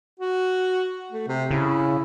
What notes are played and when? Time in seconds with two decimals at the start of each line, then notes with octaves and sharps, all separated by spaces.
0.20 F#4
1.12 A3
1.28 C3
1.51 C#3 E4